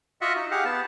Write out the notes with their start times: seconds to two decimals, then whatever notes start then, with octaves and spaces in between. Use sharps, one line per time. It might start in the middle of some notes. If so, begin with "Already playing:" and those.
0.21 F4 F#4 D#5 E5 F#5
0.36 D#4
0.51 G4 G#4 F5 F#5
0.65 B3 A5